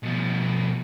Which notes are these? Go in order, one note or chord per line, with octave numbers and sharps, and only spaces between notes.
B2 F3